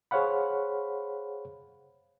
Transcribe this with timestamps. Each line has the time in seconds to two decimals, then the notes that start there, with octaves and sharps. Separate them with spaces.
0.11 G#4 C5 C#5 F5 F#5 B5